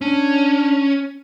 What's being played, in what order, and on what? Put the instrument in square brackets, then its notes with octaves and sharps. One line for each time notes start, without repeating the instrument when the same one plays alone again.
[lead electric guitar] C#4 [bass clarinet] D4